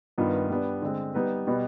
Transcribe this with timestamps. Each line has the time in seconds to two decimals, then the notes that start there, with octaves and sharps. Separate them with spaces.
0.18 G2 D#3 B3 F4 B4
0.50 G3 B3 D4
0.82 D3 G#3 C4
1.14 G3 B3 D#4 B4
1.47 B2 G3 B3